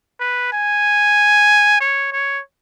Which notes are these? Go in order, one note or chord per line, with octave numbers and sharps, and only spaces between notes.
B4
G#5
C#5
C#5